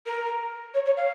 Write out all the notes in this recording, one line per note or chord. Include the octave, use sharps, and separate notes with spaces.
A#4
C#5
C#5
F5